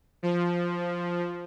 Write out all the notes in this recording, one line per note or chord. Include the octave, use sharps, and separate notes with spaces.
F3